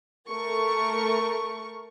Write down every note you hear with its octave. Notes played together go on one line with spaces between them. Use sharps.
A3 A#4 C#6